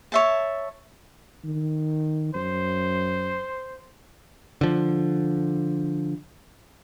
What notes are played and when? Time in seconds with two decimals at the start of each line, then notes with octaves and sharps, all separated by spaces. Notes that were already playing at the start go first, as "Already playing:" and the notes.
0.12 C#5 E5 A5
1.44 D#3
2.35 F#2 C5
4.61 D3 F3